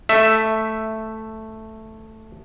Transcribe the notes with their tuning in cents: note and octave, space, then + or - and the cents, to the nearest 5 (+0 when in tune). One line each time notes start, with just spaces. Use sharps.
A3 +0 E5 +0